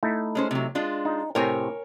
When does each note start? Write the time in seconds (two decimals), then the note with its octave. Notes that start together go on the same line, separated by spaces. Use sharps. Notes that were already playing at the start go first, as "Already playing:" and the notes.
0.03 A3 D#4 E4
0.35 G#3 C#4 C5
0.51 C3 F#3
0.75 G#3 D4 F4
1.05 D#4
1.35 A2 C3 C4 A#4 C#5 G#5